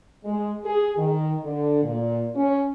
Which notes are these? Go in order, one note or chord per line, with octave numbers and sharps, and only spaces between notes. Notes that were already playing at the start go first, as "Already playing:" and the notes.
G#3
G#4
D#3
D3
A#2
C#4